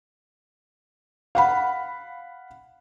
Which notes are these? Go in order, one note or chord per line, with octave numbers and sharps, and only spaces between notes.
F5 F#5 B5